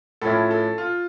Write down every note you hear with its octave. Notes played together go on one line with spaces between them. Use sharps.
A2 F3 C#4 E4 A4
A4
F4